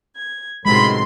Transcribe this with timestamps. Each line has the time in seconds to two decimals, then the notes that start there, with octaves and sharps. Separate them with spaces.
0.15 G#6
0.66 A1 C3 D#3 F#3 G#3 B5 C6